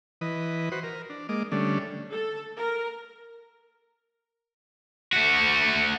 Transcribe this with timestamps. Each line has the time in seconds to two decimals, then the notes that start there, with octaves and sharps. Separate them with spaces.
0.21 E3 B4 D#5
0.72 F#4 B4 C5
0.83 A#4
1.10 D4
1.29 G#3 A#3 D#5 D6
1.52 D3 G3 A3 C#4 D4
2.11 A4
2.58 A#4
5.13 A3 F#4